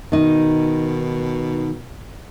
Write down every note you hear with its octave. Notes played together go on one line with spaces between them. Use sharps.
B2 D#3 D#4